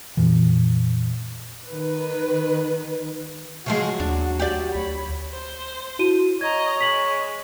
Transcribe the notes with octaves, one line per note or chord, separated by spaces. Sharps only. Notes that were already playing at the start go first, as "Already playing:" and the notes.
F2 A#2 E3
D#3 B4
C#3 F3 F#3 G#3 F#4
D#2 D4
G4 D5
D2 C#5 B5
C5
E4 F#4 D#7
C#5 D#5 A#5 G#6
G#3 B6 F#7